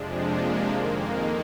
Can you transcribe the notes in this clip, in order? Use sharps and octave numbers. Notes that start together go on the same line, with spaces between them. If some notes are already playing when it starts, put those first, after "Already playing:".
Already playing: F2 C3 F3 G#3 D4
A#3
F2 D#3 G#3